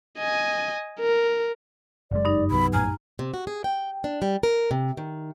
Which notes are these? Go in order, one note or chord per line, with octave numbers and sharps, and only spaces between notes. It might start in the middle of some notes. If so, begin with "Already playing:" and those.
D#5 G#5
A#4
F#1 F#2 G#3 D5
G2 D#4
C2 F#3 B3 B5
A#1 F#2 A2 G#5 A#5 F6
C3
F#4
G#4
G5
D4
G3
A#4
C3
D#3